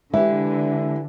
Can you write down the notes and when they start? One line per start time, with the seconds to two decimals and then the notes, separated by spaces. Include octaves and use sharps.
0.14 D3 E3 G#3 G4 E5